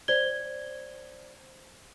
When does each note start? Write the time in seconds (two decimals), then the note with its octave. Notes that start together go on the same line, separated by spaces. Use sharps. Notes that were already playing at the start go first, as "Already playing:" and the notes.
0.08 C5 D5 G#6 G7